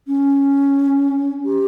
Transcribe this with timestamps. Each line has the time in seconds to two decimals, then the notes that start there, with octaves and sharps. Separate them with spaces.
0.07 C#4
1.45 G4